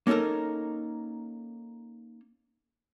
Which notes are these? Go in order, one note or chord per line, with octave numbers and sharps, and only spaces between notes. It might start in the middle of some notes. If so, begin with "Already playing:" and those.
A#3 C#4 D#4 A4 A#4